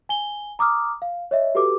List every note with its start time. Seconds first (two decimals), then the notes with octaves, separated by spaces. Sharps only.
0.09 G#5 G7
0.59 A#5 D6 D#6 F6
1.02 F5
1.31 C#5 D#5 E5
1.55 F#4 G4 A4 B4 D6